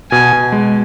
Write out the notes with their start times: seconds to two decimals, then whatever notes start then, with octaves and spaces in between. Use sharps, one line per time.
0.11 B2 G#5
0.33 B2
0.52 G#3